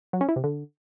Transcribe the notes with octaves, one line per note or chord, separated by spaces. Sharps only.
F#3
C#4
E4
C3
D3